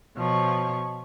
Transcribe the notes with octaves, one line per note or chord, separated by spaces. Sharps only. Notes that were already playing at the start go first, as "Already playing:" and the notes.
B2 F3 C#5